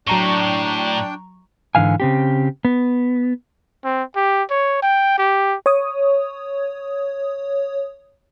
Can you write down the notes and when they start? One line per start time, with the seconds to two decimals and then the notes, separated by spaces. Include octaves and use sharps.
0.07 A2 F#3 D4 G5 A#5 C#6
1.75 G#2 D3 E3 F5 G#5
2.00 C#3 C4 G4
2.65 B3
3.84 C4
4.16 G4
4.50 C#5
4.82 G5
5.18 G4
5.66 C#5 D#6